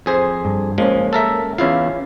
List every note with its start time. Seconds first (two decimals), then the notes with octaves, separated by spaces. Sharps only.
0.06 F2 G#4 C5
0.45 G2
0.78 F3 G#3 A#3 C#4
1.13 A4 A#4 E5
1.58 E2 C#4 E4 F4 F5